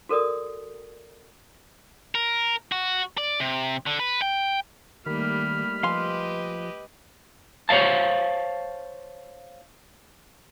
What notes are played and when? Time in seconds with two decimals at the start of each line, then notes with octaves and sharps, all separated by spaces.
0.09 F#4 A4 A#4 D5 D#6
2.15 A#4
2.72 F#4
3.18 D5
3.40 C3
3.86 D3
4.00 B4
4.22 G5
5.06 D#2 D#3 G3 A3 A#3 B5 F6
5.83 F3 G4 B4 D#5 F5 G#5 C6
7.69 C5 C#5 E5 F5 A5